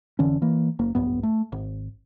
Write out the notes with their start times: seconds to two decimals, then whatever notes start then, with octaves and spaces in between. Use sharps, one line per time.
0.19 F1 D3 E3 C#4
0.42 E3 A#3
0.79 F#1 A#3
0.95 D1 A#1 G2 B3
1.23 A3
1.52 G#1